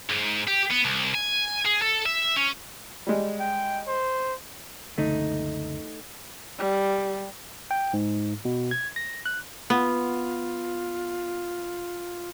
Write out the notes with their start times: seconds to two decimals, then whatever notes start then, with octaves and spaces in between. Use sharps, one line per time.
0.09 G#2
0.47 G4
0.71 B3
0.85 C2
1.15 G#5
1.65 G#4
1.82 A4
2.06 E5
2.36 C#4
3.07 G3 G#3
3.40 G5
3.88 C5
4.98 F#1 C#2 D3 A3 D#4
6.58 G3
7.71 G5
7.93 G#2
8.45 B2
8.71 G#6
8.96 A#6
9.26 F#6
9.70 B3 F4